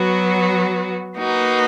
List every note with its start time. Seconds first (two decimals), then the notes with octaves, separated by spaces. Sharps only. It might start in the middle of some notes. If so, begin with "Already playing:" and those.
Already playing: F#3 B3 F#4
1.17 A#3 D#4 F#4 B4